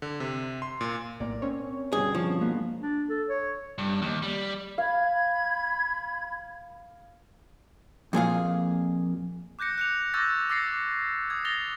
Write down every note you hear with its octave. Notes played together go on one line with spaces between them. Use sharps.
D3
C3
C6
A#2
B1 A2 A#3 A#4 D5
C4 C#4 C#5
G2 B2 D3 G#4
F3 C#6
G#3 A#3 B3
D4
A4
C#5
G2
D#2
G3
F5 B5 G#6
F2 A#2 G#4 F5
D6 F#6 G6 A#6 C#7
F#6 C#7 F7
C#6 D6 E6 G6 A6 A#6
D6 E6 A6 A#6 C7 C#7
D#6 G#6
D#6 A6 A#6 F7 G7